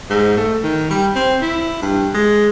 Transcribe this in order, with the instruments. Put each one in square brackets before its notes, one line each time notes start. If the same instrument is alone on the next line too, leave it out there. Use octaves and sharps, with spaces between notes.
[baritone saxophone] G#2
A3
D#3
G3
C4
E4
G2
G#3